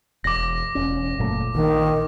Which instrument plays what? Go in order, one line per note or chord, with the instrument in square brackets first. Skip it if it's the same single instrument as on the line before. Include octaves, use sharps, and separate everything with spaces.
[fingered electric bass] E1 [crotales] D6 A#6
[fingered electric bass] E1 C#4
F#1 A#2 A3
[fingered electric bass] A#1 [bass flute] D#3